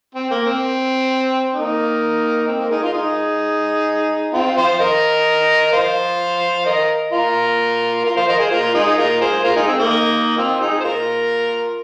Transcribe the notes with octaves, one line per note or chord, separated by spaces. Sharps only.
C4
A#3
C4
A#3 D#4
C4
A#3
D#4 G#4
F4 A#4
D#4 G#4
C4 F4
C5 F5
A#4 D#5
C5 F5
A#4 D#5
F4 A#4
F4 A#4
C5 F5
A#4 D#5
G#4 C5
F4 A#4
D#4 G#4
F4 A#4
G#4 C5
F4 A#4
D#4 G#4
C4
A#3 D#4
C4 F4
D#4 G#4
C5
F4 A#4